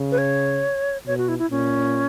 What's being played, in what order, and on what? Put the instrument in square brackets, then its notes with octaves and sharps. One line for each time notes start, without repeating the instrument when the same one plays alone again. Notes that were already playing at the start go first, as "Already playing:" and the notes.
Already playing: [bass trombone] C#3
[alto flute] B4
C#5
[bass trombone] B2 [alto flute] C#5
[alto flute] F#4
E4
E4
[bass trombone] A#2 [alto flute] C#4